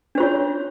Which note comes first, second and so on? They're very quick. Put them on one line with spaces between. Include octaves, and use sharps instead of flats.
D4 C5 F4 C#5